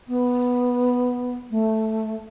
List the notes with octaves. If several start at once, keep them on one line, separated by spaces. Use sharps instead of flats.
B3
A3